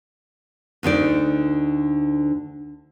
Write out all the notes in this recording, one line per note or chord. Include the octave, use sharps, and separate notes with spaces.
D2 D3 D#4 D5